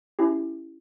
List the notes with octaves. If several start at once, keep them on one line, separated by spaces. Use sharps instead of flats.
C#4 E4 G4